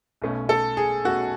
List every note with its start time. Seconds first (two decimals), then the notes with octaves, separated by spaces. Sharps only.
0.22 B1 B2 A3 C#4
0.49 A4
0.77 G#4
1.04 B1 B2 A3 C#4 F#4